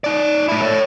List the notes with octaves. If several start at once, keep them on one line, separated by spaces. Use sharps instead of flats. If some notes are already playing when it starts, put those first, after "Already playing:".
D#4 D5
A3 E4
C#5 E5